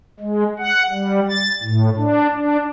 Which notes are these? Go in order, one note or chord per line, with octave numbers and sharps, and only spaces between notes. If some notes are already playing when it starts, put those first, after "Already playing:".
G#3
F#5
G3
A6
A2
D4
D4